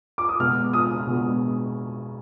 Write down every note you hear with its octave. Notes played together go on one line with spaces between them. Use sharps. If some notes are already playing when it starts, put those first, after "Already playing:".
D6
D#6
B2 G#3 B3 F6
D#6
B2 G#3 B3